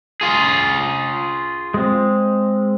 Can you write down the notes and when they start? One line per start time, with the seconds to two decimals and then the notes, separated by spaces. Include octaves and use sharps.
0.21 F4 G#4
1.74 G#3 C4